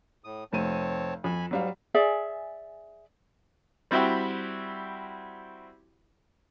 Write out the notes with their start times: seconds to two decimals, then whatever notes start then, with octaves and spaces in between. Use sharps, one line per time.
0.24 A2 D#6
0.53 F1 C4 C#5 A5 D#7
1.24 F2 G#5 B5
1.51 G#2 F#3 G3 F5
1.94 G#4 D5 E5
3.91 G3 C4 E4 F#4 G4 E5